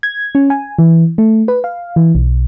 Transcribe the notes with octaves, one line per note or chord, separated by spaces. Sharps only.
G#6
C#4
G#5
E3
A3
B4
F5
E3
B1